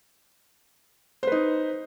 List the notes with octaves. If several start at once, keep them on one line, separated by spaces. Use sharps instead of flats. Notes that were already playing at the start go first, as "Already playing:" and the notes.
D#4 B4 C5